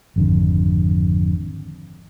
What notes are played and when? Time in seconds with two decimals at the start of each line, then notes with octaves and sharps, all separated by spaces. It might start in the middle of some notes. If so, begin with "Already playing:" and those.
0.16 G#1 F2 D3